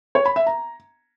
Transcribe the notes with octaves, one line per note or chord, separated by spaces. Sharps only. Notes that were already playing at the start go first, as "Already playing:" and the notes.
C#5
B5
E5
A#5